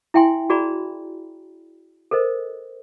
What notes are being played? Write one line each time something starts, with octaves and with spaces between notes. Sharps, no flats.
E4 E5 G5 G#5 C6
F#4 G#4 D5 A#5 B5
A4 A#4 C5 D#5